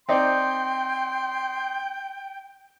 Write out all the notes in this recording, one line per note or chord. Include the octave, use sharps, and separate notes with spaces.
C4 D#4 D5 G5 C6